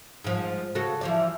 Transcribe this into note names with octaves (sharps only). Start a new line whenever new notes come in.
G#2 F3
C#3 F#4 A4
E3 F3 D5